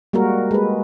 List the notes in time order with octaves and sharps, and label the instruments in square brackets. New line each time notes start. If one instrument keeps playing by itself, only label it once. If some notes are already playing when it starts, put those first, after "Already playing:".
[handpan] G3 G#3 A#3 F#4 A#4
G#3 B4